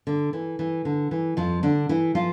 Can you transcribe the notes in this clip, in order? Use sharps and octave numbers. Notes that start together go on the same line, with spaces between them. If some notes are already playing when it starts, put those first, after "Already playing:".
D3
E3
E3
D3
E3
F2 F3
D3 D4
E3 E4
F3 F4